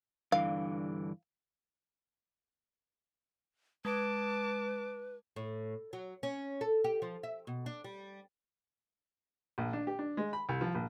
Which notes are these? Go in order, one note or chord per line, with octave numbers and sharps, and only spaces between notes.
G2 D3 E3 F5
G#3 B4 A5 D6
A2
F#3
C#4
A4
G4
F3
E5
B2
D4
G3
A#1
D4
G4
D4
G#3
B5
C2
F3
A#1